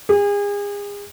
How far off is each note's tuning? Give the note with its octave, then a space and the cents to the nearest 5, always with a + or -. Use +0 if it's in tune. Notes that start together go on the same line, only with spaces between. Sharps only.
G#4 -35